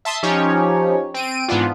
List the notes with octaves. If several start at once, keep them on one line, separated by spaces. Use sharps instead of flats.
E5 A5 C6 D#6
F3 C#4 D#4 G4 C#5
C4 D7 D#7
G#2 E3 B3 D4 F4